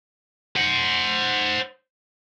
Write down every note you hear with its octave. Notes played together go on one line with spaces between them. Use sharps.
C5 F#5